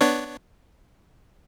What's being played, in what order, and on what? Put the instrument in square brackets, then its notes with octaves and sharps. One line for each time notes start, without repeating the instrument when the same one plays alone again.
[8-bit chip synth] B3 D4 C#5